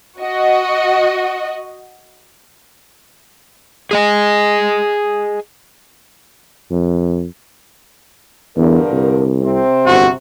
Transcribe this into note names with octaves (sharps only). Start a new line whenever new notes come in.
F#4 D#5
G#4 D#5 G#5
F2
E2 G2 D3 A#4
C2
C3 C4
G1 F#4